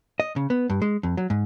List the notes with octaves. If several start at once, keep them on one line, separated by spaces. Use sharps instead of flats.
D#5
C#3
B3
G2
G#3
F2
F#3
G#2